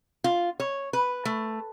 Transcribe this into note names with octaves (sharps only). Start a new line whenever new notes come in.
F4
C#5
B4
A3